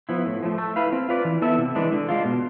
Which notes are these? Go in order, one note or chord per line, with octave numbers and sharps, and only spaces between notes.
F3 B3 E4
A2
F3 A3
A3
E4 B4 F5
C4
F4 B4 D5
E3
B3 E4 A4 E5
C3
E3 G#3 D4
D3
G#3 D4 F4
B2